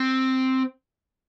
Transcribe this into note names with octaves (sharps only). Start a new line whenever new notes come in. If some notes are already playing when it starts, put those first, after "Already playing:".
Already playing: C4